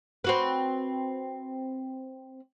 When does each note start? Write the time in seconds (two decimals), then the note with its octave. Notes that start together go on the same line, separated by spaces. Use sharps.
0.24 C4 F#4 B4